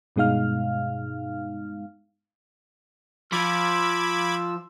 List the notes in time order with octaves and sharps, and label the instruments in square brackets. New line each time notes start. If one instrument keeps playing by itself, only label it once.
[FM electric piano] G2 B2 G#3 D#4 F5 F6
[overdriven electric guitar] F3 [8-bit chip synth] B5 D6 G#6 [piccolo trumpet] E6